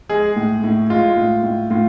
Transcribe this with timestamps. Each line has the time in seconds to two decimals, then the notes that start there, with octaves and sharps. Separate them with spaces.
0.09 G#3 G#4
0.36 A2
0.64 A2
0.90 G#3 F4
1.17 A2
1.43 A2
1.70 A2 F4